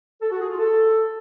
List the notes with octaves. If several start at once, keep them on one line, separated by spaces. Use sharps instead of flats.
A4
F#4
G#4
F4
A4